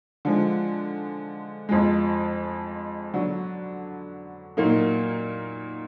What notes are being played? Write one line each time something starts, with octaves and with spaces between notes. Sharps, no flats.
D3 F3 G#3
F2 F3 G#3
D3 F#3 D4 F#4
A#2 F#3 A#3 D#4